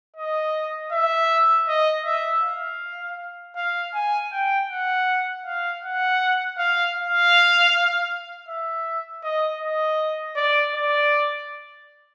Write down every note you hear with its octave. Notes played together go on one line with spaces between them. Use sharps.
D#5
E5
D#5
E5
F5
F5
G#5
G5
F#5
F5
F#5
F5
F5
E5
D#5
D#5
D5
D5